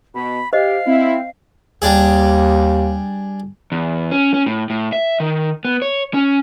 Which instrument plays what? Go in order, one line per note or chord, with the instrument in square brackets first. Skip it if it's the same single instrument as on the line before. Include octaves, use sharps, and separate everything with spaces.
[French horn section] B2 [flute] B5
[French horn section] G4 [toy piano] C5 D#5 [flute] F5
[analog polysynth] C4 [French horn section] E4
[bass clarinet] D#2 [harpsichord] G3 D4 G#4
[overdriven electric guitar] E2
C#4
C#4
A2
A2
E5
D#3
B3
C#5
C#4